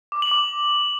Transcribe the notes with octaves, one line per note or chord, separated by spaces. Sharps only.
D6
F#7
D6